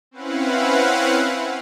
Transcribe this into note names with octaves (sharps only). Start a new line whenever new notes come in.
C4 C#4 E4 B4 F5 F#5